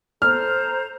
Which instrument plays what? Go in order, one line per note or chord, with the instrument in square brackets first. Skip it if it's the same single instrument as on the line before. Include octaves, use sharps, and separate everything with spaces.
[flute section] A4 C5 A#5 [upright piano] F6